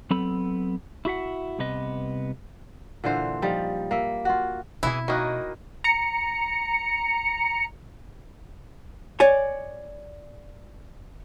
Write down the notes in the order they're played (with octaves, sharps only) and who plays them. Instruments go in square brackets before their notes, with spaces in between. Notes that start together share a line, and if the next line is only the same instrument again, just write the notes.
[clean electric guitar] F#3 B3 C4 A4 B5
E4 F#4 E5 F#5
C2 C3 B3 B4 D#5
[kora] A#2 D3 E3 C5
F3 G3 D#4
A#3 E5
F4 F#4
[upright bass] B2 C4 [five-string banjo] E3 G#4 [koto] E4
[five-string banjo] D#3 A#3 [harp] F#4 D#5 F#6
[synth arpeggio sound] A#5 C#7
[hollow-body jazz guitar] C#5 D5 G#5